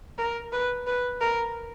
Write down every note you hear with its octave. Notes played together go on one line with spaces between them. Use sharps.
A#4
B4
B4
A#4